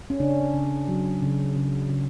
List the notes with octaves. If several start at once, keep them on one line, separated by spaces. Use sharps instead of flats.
C#4
C#3 D4
C#3
F#3
C#3
C#3
C#3